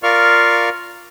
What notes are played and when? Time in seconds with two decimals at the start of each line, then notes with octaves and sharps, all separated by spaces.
0.03 F4 A#4 D5 F5 C#6 F6